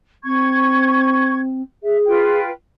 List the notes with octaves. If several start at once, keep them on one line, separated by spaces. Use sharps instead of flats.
C4 C#6 G#6
G#4 E5
F4 B4 G5